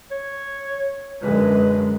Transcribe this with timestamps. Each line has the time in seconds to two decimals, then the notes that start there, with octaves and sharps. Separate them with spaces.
0.11 C#5
1.22 F#2 D3 G#3 B4